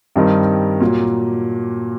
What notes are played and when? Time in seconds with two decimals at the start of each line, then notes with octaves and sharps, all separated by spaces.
0.16 G2 D#3 G3 C4 D#4
0.81 A#2 F#3 A#3